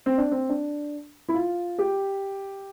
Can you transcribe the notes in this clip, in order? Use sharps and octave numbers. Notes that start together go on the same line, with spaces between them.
C4
D4
C4
D4
E4
F4
G4